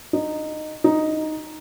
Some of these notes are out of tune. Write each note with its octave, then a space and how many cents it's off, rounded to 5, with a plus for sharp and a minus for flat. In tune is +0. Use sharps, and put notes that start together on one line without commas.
D#4 -15
D#4 +0